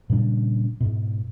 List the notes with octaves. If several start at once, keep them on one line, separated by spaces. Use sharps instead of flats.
A#2 C#3 G3 D4
G#2 B2